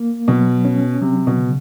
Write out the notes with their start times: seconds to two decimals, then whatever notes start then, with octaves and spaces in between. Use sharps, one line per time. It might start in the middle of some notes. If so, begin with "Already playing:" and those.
Already playing: A#3
0.28 B2 F#3
0.65 C#4
1.02 C3 F#3
1.27 B2
1.38 C#3